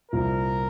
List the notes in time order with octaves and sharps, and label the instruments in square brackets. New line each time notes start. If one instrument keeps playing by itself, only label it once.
[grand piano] C2 A#2 F3 [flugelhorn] A#4